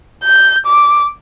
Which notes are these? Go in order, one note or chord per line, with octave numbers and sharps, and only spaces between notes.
G6
D6